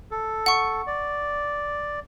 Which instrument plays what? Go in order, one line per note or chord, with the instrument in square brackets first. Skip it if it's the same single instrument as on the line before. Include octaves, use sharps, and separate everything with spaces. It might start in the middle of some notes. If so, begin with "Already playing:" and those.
[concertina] A4
[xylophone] F#5 C#6
[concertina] D5